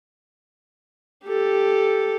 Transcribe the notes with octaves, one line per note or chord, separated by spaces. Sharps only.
G4 A4